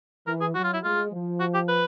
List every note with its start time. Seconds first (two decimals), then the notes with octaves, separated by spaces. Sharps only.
0.27 E3 A#4
0.41 G#4
0.55 F#3 F#4
0.64 F4
0.74 E4
0.83 G#3 F4
1.12 F3
1.40 F#4
1.54 G4
1.68 B4